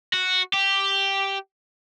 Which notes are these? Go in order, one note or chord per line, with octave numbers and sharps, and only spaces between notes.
F#4
G4